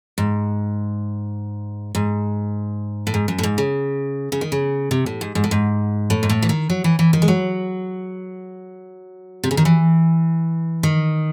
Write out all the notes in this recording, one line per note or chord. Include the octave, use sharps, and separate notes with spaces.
G#2
G#2
A2
G#2
F#2
A2
G#2
C#3
C#3
D#3
C#3
C3
A2
G#2
G#2
A2
G#2
A2
G#2
A2
E3
D#3
F#3
E3
E3
D#3
G#3
F#3
C3
C#3
D#3
E3
D#3